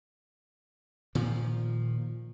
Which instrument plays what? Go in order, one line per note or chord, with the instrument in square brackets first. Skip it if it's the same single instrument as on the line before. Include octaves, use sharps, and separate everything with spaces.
[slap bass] A#2 D#3 F3